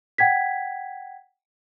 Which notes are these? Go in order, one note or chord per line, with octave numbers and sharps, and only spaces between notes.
F#5 G5 G#6 B6